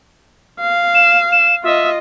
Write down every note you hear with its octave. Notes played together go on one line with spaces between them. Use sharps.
F5
E7
E7
F4 D#5 E5